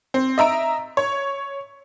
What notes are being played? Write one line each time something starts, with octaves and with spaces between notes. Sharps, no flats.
C4
D#5 E5 A#5 D7
C#5